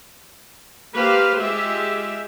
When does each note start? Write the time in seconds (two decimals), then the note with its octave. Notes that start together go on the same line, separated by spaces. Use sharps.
0.96 A#3 G4 B4 C5 F5
1.40 G#3 F4 G4 E5